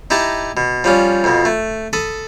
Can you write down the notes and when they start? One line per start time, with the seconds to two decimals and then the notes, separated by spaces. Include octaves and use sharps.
0.10 D#4 E4 G4 A5 A#5
0.57 B2
0.84 F3 G3 C#4
1.24 F2 B2
1.45 A3
1.93 A4 B5 D#6